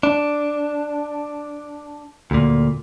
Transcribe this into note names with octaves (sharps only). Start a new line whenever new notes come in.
D4
D2 A#2